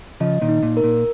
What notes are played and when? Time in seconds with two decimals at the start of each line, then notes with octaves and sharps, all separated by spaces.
0.20 C#3 F3 D#5
0.41 A#2 D#3
0.48 D#4
0.63 A#2
0.77 A#4
0.84 A#2